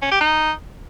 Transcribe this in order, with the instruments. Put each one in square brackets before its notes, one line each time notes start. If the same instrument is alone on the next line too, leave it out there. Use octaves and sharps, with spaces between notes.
[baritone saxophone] C#4
G4
D#4